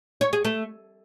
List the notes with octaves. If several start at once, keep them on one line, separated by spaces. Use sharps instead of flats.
C#5
G#4
A3